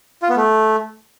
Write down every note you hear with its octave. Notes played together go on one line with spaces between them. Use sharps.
F4
B3
A3